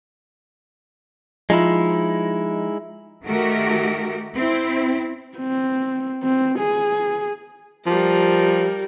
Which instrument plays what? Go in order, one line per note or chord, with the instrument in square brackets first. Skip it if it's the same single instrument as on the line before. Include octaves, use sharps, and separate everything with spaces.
[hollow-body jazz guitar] F3 [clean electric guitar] G#3 D#4 E4
[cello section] D#3 A3 F#4 G4 A#4
C4 E4
[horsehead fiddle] C4
C4
G#4
[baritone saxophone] F3 [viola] G3 A#4